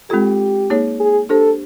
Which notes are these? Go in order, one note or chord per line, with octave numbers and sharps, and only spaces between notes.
G#3 C4 F4 G4 A4
A#3 D#4 G#4 C#5
G#4
D4 G4 A4 C5